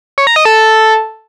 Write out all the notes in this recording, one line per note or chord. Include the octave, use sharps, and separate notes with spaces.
C#5
A#5
D#5
A4